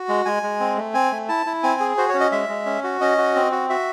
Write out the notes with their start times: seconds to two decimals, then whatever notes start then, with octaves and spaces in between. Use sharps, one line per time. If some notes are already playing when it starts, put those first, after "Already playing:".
Already playing: F#4
0.09 G#3
0.25 G#3 G#5
0.43 G#3
0.60 C4
0.77 A3
0.94 C4 G#5
1.12 A3
1.29 E4 A5
1.46 E4
1.63 C4 G#5
1.80 G#4
1.97 F#4 C5
2.09 C#5
2.14 C#4
2.20 D#5
2.32 G#3 E5
2.49 G#3
2.66 C#4
2.84 F#4
3.01 C#4 D#5
3.18 F#4
3.36 C4
3.52 F#4
3.70 F#4 E5